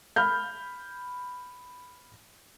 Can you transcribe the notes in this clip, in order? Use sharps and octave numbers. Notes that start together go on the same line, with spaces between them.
B5 F6 G6